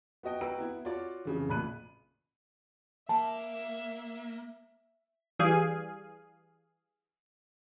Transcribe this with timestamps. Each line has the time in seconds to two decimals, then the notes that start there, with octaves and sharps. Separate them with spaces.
0.23 B3 F#4 D#5 G5
0.41 F#4 B4 G5 A#5 E6 D7
0.58 B3 E4
0.85 F4 F#4 C#5 D5
1.25 F2 C#3 E3
1.49 A1 A#2 B5 F#6 D#7
3.09 A#3 E5 A5
5.39 E3 G3 G#4 F5 G#5